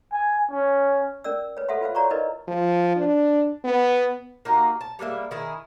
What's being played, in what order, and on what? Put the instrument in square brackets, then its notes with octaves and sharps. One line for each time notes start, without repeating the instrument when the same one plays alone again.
[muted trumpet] G#5
C#4
[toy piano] C#4 A#4 D5 E6
B4 C#5
A4 C5 E5 F#5 C6
F4 B4 C5 F5
F#4 C#5 D5 A#5 C6 C#6
D#4 E4 A#4 B4 D5 D#5
[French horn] F3
D4
B3
[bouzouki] A#3 D#4 F#4 G4
A5
G3 G#3 A#3 E5
D#3 E4 G#4